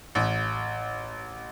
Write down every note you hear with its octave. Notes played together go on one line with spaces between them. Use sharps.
A1